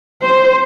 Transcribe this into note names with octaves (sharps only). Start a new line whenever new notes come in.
C5